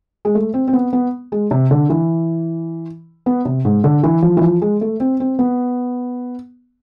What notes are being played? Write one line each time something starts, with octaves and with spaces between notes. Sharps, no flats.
G#3
A3
C4
C4
B3
B3
G#3
C3
D3
E3
B3
C3
G#2
D3
E3
F3
E3
F3
G#3
A3
C4
C4
B3